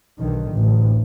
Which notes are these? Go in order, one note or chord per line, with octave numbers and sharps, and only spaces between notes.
B1 D3 D#3
A1 D2